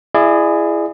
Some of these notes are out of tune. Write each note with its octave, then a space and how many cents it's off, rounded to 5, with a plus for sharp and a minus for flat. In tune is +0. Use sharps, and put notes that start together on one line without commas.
E4 +20 G#4 +0 D5 +40